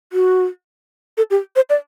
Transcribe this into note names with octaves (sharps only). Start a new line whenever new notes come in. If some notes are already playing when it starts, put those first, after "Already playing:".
F#4
A4
G4
C5
D5